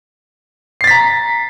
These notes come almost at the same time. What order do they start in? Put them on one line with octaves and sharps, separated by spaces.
C7 A6 B6 A#5